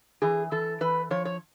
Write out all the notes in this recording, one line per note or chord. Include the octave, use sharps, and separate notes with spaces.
E3 G#4
E3 A4
E3 B4
F3 C#5
C#5